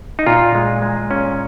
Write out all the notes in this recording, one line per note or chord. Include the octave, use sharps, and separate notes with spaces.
D#4
A#2 F4
G#3
G#3
A#2 C#4